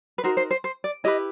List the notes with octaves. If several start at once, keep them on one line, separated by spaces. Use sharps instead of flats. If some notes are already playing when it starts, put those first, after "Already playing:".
B4
D#4 F#4 A#4 C5
C5
C5
C5
D5
E4 G4 B4 D#5